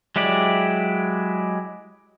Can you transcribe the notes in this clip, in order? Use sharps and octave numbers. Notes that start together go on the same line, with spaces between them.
F#3 G#3 E4 G4 D5